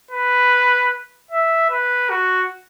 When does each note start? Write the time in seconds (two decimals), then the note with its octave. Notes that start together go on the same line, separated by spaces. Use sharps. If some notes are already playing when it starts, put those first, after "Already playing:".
0.11 B4
1.31 E5
1.70 B4
2.10 F#4